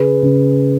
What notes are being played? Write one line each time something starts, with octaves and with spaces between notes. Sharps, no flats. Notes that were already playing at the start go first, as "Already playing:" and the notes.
Already playing: C#3 G#4 B4
C#3